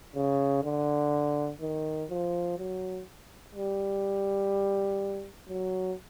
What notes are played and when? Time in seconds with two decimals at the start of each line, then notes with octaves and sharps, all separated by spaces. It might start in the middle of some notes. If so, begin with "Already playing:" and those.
0.15 C#3
0.64 D3
1.61 D#3
2.10 F3
2.58 F#3
3.55 G3
5.49 F#3